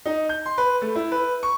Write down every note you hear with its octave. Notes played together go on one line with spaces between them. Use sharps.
D#4
G6
C6
B4
A3
E4
B4
C#6